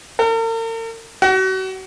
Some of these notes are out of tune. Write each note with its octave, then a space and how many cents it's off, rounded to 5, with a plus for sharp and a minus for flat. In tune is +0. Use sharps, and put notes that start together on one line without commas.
A#4 -45
F#4 +35